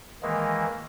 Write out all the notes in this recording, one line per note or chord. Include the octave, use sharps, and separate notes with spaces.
D#3 E3 G#3 A#3